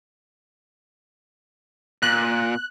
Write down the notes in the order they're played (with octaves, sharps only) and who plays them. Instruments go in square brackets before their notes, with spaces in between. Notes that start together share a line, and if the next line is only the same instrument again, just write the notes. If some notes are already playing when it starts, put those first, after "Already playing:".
[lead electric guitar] A#2 [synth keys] F#6